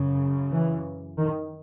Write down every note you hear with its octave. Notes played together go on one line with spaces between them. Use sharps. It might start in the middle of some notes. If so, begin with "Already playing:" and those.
Already playing: F#2 C#3
E3
D#3